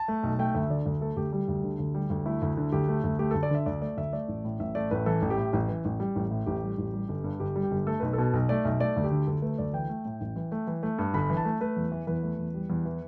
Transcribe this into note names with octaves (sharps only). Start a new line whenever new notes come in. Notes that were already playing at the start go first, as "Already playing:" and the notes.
Already playing: A5
A3
B1
A3 G5
D2 E5
D3 D5
D2
A3 A4
D2 G4
G3 G4
D2
D3
D2
G3
D2
A3 E4
D2
D3
D2 G4
A3
D2
A3 G4
D2 A4
D5
D3 E5
D2 D5
A3 D5
D2 E5
A3 D5
A1
A2
A1 E5
A3 D5
A1 B4
E3 A4
A1
G4
A2
A1
E3
A1
G3
A1
A2
A1 G4
G3
A1
G3
G1
G2
G1 G4
G3
G4
G1
A3 A4
B1 B4
B2 A4
B1
A3 D5
B1 E5
A3 D5
D2
G4
D3
D2 A4
A3 B4
D2 D5
E3 G5
A3
A2
A1
E3
A3
E3
A3
G2
G1 B5
E3
A5
A3
A3 B4
E2
E3
E2 B4
A3
E2
G3
E2
E3